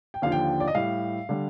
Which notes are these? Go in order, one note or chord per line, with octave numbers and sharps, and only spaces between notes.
G5
D#2 D3 F3 F5
G5
D5
D#5
A2 G3 F5
D3 G3